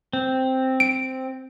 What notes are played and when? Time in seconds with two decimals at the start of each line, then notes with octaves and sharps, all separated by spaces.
0.13 C4
0.80 D7